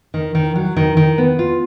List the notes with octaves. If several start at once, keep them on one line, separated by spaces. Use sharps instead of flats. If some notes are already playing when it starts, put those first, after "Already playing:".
D#3
D#3
F#3
D#3
D#3
B3
F4